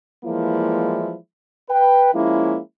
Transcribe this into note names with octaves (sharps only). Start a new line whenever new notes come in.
E3 F3 G3 G#3 A#3 E4
B4 G5
F3 G#3 A#3 C#4 E4